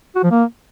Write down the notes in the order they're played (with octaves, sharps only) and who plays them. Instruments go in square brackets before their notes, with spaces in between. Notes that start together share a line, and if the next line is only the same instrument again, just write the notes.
[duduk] F#4
F3
A#3